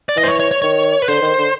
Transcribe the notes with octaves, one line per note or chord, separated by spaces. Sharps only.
D5
E3 D#5
C5
C#5
C#5
C#5
D#3 C#5
B4
D3 C5
D#3
D3